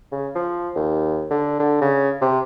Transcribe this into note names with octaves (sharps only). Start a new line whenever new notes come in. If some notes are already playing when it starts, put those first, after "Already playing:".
C#3
F3
D#2
D3
D3
C#3
C3